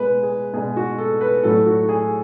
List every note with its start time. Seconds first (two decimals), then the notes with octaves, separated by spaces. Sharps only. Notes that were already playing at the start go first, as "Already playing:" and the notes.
Already playing: B2 G#3 B4
0.23 G#4
0.54 B2 G#3 G#4
0.76 F#4
0.98 A4
1.21 B4
1.43 A2 F#3 A3 A4
1.66 F#4
1.89 G#4